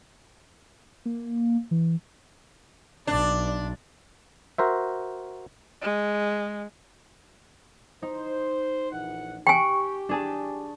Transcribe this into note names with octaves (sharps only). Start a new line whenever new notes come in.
A#3
E3
B1 D4 D5
F#4 A#4 C5 E5
G#3
D#4 C5
A#1 E3 F#5
G4 G5 G#5 C#6 F#6 C#7
D4 G#4 A5